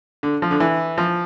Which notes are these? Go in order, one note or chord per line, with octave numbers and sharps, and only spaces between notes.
D3
F3
D3
E3
F3